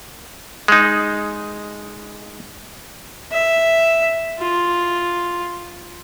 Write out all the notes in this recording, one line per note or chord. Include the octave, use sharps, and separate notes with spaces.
G#3 D#4
E5
F4